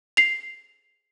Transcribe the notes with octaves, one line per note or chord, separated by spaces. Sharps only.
C7 F7